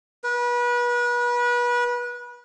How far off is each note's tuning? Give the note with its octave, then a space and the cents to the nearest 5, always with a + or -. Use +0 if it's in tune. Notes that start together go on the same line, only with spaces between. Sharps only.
B4 -30